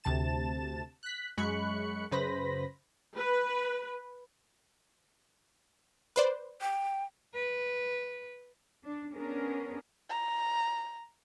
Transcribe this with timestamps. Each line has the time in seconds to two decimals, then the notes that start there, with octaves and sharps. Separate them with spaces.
0.04 D2 C3 A5 A6 E7
1.03 F#6 B6
1.37 F#2 G#3 B5 C#6 F#6 C#7
2.11 F#2 C#3 B4 C5 B5 A#6
3.16 B4
6.16 B4 C5 D5
6.61 G5
7.34 B4
8.84 D4
9.14 B3 C#4 D4 G#4 A#4
10.09 A#5